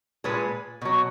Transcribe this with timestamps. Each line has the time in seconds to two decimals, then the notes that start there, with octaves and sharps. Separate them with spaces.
0.24 A#2 G#3 G#4 B4
0.82 B2 F#3